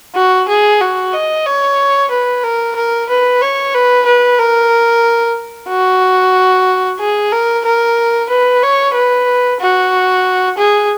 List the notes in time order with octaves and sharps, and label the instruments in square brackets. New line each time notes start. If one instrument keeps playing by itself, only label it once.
[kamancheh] F#4
G#4
F#4
D#5
C#5
B4
A#4
A#4
B4
C#5
B4
B4
A#4
F#4
G#4
A#4
A#4
B4
C#5
B4
F#4
G#4